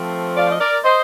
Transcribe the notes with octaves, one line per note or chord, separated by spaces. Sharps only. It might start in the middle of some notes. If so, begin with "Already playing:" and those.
Already playing: F3 A3 C4
D5 F5
D#5
A#4 D5
C5 D#5